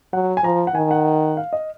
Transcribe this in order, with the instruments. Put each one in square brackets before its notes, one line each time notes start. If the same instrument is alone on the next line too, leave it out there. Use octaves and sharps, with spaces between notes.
[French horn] F#3 [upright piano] F#5
[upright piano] G#5
[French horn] F3 [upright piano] A#5
[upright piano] F#5
[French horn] D#3 [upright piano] G#5
[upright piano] F#5
F5
D#5